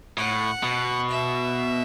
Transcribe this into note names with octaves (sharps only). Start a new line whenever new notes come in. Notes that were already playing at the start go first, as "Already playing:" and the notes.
A2 F#5
B2
E5